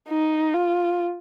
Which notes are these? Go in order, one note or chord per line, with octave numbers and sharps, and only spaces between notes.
D#4
F4